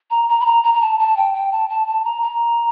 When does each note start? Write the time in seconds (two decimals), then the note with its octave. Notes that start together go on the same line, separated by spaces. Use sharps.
0.11 A#5
0.29 A#5
0.40 B5
0.46 A#5
0.64 A#5
0.74 A#5
0.81 A5
0.99 A5
1.17 G5
1.34 G5
1.52 A5
1.70 A5
1.87 A5
2.05 A#5
2.22 A#5